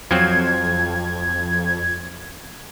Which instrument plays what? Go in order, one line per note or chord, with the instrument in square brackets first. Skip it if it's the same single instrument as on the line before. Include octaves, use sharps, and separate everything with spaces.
[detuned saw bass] F2 [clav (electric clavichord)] F3 F#3 C4 [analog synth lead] G#6